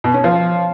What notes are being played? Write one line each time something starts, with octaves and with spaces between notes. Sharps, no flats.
B2
C#4
F3